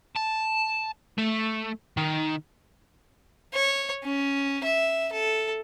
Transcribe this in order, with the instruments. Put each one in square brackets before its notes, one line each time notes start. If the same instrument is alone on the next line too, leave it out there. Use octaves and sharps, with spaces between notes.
[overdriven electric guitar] A5
A3
D#3
[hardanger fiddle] C#5
C#4
E5
A4